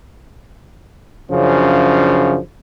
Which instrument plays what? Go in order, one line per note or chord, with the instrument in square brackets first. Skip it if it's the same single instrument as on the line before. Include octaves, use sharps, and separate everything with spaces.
[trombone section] F#2 C#3 F3 D4